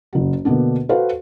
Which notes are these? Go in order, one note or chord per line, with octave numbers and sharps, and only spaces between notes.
F#1 F#4
B2 D3 A#3 B3 D4
F#4 A4 B4 C5 F5